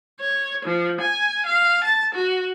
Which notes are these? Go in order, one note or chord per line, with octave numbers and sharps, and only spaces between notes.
C#5
F3
G#5
F5
A5
F#4